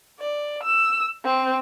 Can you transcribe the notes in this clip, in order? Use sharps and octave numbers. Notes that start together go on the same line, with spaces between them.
D5
E6
C4